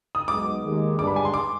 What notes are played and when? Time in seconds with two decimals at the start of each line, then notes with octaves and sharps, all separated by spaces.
0.15 D#6
0.28 B1 B2 G#3 D6
0.64 D#2 D#3 G#3
0.98 G2 D3 G#3 D4 D6
1.07 B5
1.16 G#5
1.25 C6
1.34 D6